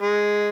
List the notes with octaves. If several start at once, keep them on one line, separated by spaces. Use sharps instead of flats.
G#3